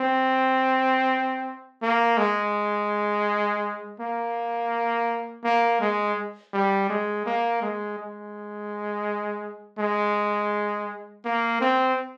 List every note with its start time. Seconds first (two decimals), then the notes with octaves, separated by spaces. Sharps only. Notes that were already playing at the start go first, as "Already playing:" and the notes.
Already playing: C4
1.82 A#3
2.18 G#3
4.00 A#3
5.44 A#3
5.81 G#3
6.53 G3
6.90 G#3
7.26 A#3
7.62 G#3
7.98 G#3
9.79 G#3
11.25 A#3
11.61 C4